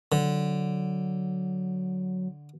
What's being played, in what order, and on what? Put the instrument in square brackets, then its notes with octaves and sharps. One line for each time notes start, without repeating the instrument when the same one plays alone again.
[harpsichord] D3 [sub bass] F#3